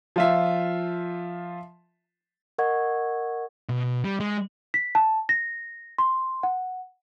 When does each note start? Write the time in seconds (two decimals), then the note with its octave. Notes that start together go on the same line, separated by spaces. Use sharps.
0.16 F3 F4 E5
2.58 A#4 D#5 F#5 C#6 G#6
3.69 B2
4.04 G3
4.20 G#3
4.74 B6
4.95 A5
5.29 A#6
5.98 C6
6.43 F#5